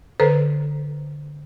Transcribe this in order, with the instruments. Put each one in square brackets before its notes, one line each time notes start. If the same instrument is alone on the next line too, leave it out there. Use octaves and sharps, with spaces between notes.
[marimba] D3 A4 B4 C5 A#5